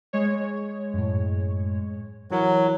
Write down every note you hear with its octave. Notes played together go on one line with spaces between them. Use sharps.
G#3 C#5
F#2 A2
E3 F#3 E4 A#4